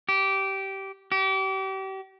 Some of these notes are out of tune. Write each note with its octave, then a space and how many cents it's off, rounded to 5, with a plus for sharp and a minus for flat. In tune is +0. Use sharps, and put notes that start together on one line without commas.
G4 -15
G4 -35